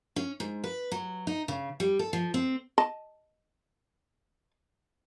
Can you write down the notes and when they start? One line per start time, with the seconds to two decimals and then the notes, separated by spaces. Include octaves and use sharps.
0.16 C#4
0.40 G#2
0.64 B4
0.92 F#3
1.27 D#4
1.48 C#3
1.80 G3
1.99 A4
2.13 F3
2.34 C4
2.78 D#5 A5